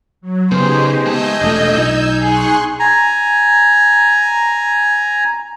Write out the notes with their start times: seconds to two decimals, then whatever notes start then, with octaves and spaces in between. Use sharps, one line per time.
0.21 F#3
0.51 C#3 B3 D#4 G4 G#4 C5
1.06 G#3 D#5 G#5 A5 E6 G6
1.41 E1 A3 D4 F4
1.77 B1 D#4
2.22 G#4 C6 C#6 F#6
2.79 G#5 A#5